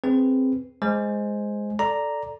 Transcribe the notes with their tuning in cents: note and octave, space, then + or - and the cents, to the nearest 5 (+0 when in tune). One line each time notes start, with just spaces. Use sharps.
C4 +0 G#4 +0 B4 +0
G#3 +0 C5 +0 G#5 +0
A4 +0 D5 +0 A#5 +0